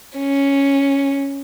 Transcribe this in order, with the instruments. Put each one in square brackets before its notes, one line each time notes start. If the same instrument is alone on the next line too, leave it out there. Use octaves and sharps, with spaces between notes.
[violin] C#4